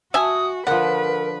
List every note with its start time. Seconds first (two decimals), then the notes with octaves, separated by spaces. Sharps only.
0.14 F#4 E5 G#5 D#6
0.67 D3 F3 A#4 B4 F#5